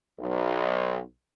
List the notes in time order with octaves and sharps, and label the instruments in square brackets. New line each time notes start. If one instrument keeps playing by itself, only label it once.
[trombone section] B1